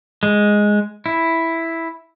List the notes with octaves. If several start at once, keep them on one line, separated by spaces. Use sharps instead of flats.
G#3
E4